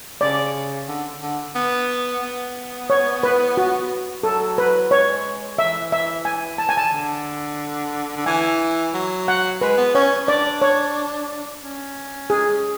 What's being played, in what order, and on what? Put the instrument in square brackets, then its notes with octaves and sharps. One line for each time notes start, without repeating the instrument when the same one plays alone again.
[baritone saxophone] C#3 [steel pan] D5
[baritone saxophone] D3
D3
B3
B3
[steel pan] C#5
B4
F#4
[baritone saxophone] F#3 [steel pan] A4
[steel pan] B4
[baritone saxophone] G#3 [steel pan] C#5
[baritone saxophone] E3 [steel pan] E5
[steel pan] E5
G#5
A5
G#5
A5
[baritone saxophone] D3
D3
[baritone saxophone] E3 [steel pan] G#5
[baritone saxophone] F#3
[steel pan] F#5
[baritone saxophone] G#3 [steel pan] B4
[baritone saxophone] B3
[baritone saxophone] C#4 [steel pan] C#5
[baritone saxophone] D4 [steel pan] D5
[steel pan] C#5
[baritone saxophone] C#4
[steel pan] G#4